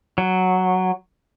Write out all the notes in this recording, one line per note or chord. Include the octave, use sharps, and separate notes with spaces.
F#3